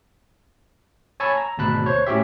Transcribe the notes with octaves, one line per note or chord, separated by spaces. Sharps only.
C#5 G#5 A5 B5 C#6 E6
A#5
G#1 D2 B2 A5 B5 F#6
C5 C#5
A2 C#4 F#4 G4 E5